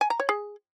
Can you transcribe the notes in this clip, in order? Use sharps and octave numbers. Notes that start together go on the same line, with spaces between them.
G#5
A#5
C#5
G#4